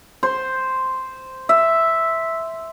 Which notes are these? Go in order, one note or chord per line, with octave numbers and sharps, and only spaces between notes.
C5
E5